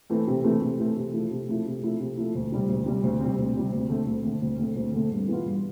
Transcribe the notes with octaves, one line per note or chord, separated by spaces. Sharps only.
E3 A3 C4
C3
E3 A3 C4
C3
E3 A3 C4
C3
F3 A3 E4
C3
F3 A3 E4
C3
F3 A3 E4
C3
F3 A3 E4
D2
C3 G3 C4
D2
C3 G3 C4
D2
C3 G3 C4
D2
C3 G3 C4
D2
D3 A3 C4
D2
D3 A3 C4
D2
D3 A3 C4
D2
D3 A3 C4
G2
E3 B3 F4
G2